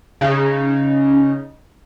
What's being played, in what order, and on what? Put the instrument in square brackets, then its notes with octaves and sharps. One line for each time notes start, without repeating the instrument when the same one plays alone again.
[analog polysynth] C#3 D#4